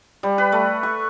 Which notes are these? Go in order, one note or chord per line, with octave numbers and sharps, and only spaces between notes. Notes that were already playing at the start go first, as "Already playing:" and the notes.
G3
B4
A3
C#6